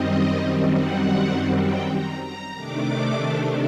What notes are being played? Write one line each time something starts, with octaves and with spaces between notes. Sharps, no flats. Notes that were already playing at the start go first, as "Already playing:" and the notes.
Already playing: F#2 D#3 G3 C4 D#5
F#5
G5
A#5
A#5
C3 D#3 A3 D4 D6